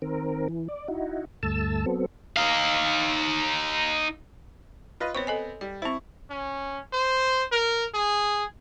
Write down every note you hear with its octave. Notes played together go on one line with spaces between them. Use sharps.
D#3 C4 A#4
E3
D5
D#4 E4 F#4
D2 G2 A3 A5 E6
F#3 B3 C4 A4
D#4 F5
F4 B4 D#5
B3 C4 C#5 C#6
A4 D#5 G#5
G3 D5
C4 E4 C5 C#6
C#4
C5
A#4
G#4